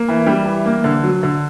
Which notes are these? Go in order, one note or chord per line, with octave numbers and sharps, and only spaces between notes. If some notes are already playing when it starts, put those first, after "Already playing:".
Already playing: A#3
E3
G3
E3
A#3
D3
F#3
D3